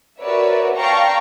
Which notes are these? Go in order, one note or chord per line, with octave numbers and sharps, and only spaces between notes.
F#4 A#4 B4 C#5 D5 E5
D5 F5 G5 A5 A#5 C#6